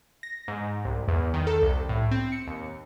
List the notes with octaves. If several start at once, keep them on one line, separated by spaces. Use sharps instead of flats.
A#6
G#2
C2
E2
D#3
A4
C2
A2
C4
C#7
D#2